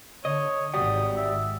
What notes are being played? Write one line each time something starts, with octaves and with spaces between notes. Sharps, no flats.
D3 C#5 D#5
G#1 G#2 G3 F#4 D#6
E5